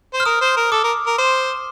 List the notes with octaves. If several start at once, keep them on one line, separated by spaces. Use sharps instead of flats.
C5
F6
A#4 D#6
C5
A#4
A4 D6
A#4
A#4
C5 C6